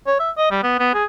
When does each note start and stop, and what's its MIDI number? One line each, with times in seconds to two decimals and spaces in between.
0.07 0.15 73
0.20 0.31 76
0.37 0.51 75
0.51 0.60 55
0.63 0.78 59
0.79 0.89 59
0.94 1.05 68